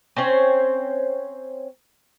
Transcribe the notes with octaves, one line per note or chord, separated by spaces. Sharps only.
C4 C#4 C5 C#5